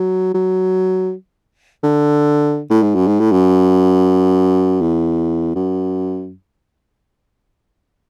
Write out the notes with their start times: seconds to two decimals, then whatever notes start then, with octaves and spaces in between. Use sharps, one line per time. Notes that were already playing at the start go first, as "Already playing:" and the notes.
Already playing: F#3
0.34 F#3
1.83 D3
2.70 A2
2.82 G#2
2.95 F#2
3.07 G#2
3.20 A2
3.32 F#2
4.81 E2
5.56 F#2